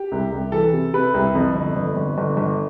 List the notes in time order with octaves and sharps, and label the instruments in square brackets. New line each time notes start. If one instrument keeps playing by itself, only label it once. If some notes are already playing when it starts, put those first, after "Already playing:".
Already playing: [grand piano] G4
C2
C2
E3 A4
C3
C3 B4
C2
F2
G1
G1
G1
G1
G1